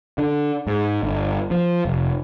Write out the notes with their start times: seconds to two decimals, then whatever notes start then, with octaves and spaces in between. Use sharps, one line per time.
0.18 D3
0.67 G#2
1.03 G1
1.51 F3
1.85 F1